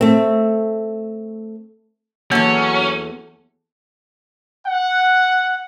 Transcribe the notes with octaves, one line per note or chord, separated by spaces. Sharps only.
A3 C4
E2 F#3 A#3 C#4 G4 A4
F#5